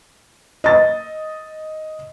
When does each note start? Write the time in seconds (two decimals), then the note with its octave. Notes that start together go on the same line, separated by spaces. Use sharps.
0.64 D#5 A6